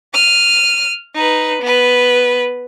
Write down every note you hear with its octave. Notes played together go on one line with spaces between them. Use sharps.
F6 D#7
D#4 B4
B3 B4